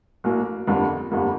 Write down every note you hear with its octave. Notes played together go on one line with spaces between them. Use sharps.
A#1 A2 F#3 A#3
G1 F2 D3 G3 A#3
G1 F2 D3 G3 A#3